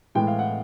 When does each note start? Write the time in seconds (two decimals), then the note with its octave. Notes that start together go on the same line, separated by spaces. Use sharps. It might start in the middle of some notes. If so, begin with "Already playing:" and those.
0.15 A2 E3 G#3 G5
0.27 F5
0.39 F#5